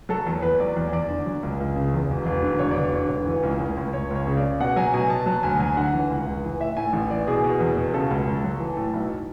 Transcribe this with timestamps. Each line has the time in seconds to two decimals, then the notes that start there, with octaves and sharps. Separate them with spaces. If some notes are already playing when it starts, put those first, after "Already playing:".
0.09 F#3 A4
0.27 E2
0.42 E2 B4
0.60 F#3 D5
0.76 E2
0.93 E2 D5
1.09 D3
1.26 F#3
1.43 C#2
1.60 C#2
1.76 C#3
1.94 E2
2.10 E1
2.26 E1
2.43 D3
2.59 E1 C#5
2.71 D5
2.77 E1
2.84 C#5
2.93 D3
3.09 E1
3.26 E3
3.43 C#2
3.60 C#2
3.77 C#2
3.93 C#2 C#5
4.10 C#2
4.15 C#5
4.27 C#3
4.37 D5
4.43 C#3
4.60 B2 F#5
4.76 F#3 G#5
4.94 B2 G#5
5.10 B2 A5
5.26 F#3 A5
5.43 D2 G#5
5.59 F#3 G#5
5.77 D3 F#5
5.93 E3
6.10 C#2
6.26 C#2
6.44 E3
6.60 A2 E5
6.77 A2 G#5
6.93 A1
7.10 E3 D5
7.27 B2 G#4
7.44 B2
7.60 E2
7.76 B2
7.94 C#3 A4
8.10 C#2
8.27 C#2
8.44 F#3
8.60 E3
8.77 A2
8.93 B1